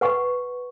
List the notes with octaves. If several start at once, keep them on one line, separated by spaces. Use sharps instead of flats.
B4 F#5 C#6